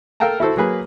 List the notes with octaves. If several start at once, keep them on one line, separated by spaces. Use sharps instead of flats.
A4 A#4 F5 G5 A5 A#5
E4 F#4 A4 C5
F#3 A#3 G#4 B4